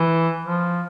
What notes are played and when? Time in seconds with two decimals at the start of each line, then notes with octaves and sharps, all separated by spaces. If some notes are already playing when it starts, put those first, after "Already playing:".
Already playing: E3
0.45 F3